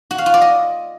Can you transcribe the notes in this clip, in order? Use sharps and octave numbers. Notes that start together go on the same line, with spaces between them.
F#4
F5
F4
D5
D#5